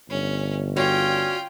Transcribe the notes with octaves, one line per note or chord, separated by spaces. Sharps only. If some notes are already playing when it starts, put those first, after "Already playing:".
G1 C#4
C#4 F4 F#4 C#5 D5 G5